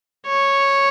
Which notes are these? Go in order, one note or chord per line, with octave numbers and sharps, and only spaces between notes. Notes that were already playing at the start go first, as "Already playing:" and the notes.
C#5